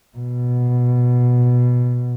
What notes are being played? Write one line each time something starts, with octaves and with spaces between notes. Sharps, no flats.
B2